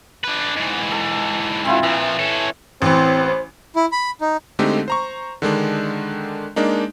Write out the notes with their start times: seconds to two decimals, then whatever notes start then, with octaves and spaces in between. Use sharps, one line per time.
0.24 D3 B4
0.57 G#2 E3
0.92 A4
1.65 C4 E4 F4
1.83 A#2 E3 F3
2.19 C#4 A4
2.82 A1 E3 C4 C5
3.76 E4
3.92 B5
4.21 D#4
4.59 D3 G#3 A3 C4 D#4 G4
4.88 C5 A#5 C#6
5.42 D3 D#3 G#3 D4
6.56 G#3 A#3 D4 D#4